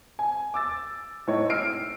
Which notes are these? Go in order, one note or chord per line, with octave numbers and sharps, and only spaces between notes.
G#5
D6 E6 A6
A2 D#4 C#5
E6 F6 C7 D7